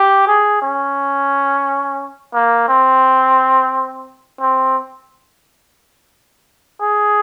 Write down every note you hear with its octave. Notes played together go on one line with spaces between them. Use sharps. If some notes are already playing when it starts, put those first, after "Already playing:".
Already playing: G4
G#4
C#4
A#3
C4
C4
G#4